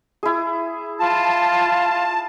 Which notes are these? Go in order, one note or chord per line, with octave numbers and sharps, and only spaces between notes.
E4 G#4
F4 A5